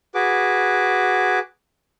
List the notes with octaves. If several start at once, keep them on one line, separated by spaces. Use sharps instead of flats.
F#4 G#4 B4 D6